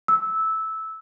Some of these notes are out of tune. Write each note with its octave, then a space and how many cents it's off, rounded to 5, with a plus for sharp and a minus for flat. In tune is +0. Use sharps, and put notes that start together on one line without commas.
E6 -10